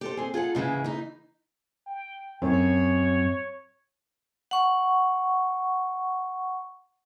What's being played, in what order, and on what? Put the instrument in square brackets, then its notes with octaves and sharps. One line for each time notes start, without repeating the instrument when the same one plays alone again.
[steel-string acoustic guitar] G4 A4 C5
C4 G#4
F4 G#4 A4 F#5
G#2 C#3 E3 G#3
E3 D#4
[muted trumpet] G5
[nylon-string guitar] F#2 [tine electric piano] C4 [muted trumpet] C#5
[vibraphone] F#5 C#6